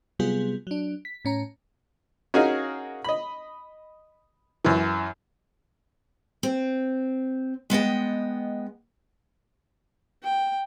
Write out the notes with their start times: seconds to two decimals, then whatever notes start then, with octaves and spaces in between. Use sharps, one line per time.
0.19 C3 F#3 G3 B3 F4 G#4
0.67 F#3 D4
1.05 B6
1.25 A2 C#4 A#5
2.34 C#4 D#4 F#4 G#4 A#4 F5
3.04 D#5 B5
4.65 F#2 E3
6.43 C4
7.70 G#3 B3 D#5 G5
10.23 G5